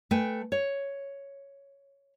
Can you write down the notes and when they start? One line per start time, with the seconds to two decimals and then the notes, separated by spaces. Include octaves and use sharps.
0.11 A3 B4 G5 G#5
0.52 C#5